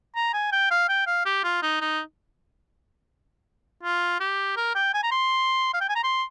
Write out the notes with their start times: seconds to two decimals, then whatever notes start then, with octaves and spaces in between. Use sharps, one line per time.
0.16 A#5
0.34 G#5
0.52 G5
0.71 F5
0.89 G5
1.07 F5
1.26 G4
1.44 F4
1.63 D#4
1.81 D#4
3.83 F4
4.20 G4
4.57 A#4
4.75 G5
4.94 G#5
5.03 A#5
5.12 C6
5.74 F5
5.81 G5
5.89 G#5
5.96 A#5
6.04 C6